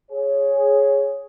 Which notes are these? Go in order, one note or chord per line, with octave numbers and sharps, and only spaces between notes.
G#4 C#5